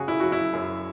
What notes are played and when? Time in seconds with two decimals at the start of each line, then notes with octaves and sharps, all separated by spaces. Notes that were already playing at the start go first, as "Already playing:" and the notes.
Already playing: F#2 C#3 F#4 G#4
0.08 E4
0.20 F#3 F#4
0.32 E4
0.53 F#2